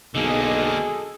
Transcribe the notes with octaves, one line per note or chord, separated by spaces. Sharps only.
B1 D3 A#3 G#4 A4 D#5